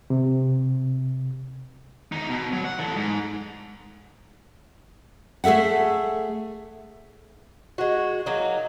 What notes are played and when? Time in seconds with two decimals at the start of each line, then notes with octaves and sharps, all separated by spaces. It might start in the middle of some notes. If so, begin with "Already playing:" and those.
0.10 C3
2.12 E2 D#4
2.29 B2
2.53 F#3
2.65 F#5
2.79 E3 A4
2.96 G#2
5.44 A3 G#4 A4 E5 F#5
7.78 G#3 F#4
8.26 F#3 A#3 D#4